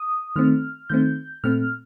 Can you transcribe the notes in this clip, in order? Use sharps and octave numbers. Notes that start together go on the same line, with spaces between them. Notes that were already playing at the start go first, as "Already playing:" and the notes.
Already playing: D#6
D#3 A3 C4 F6
D#3 A3 C4 G6
A#2 A3 C4 F6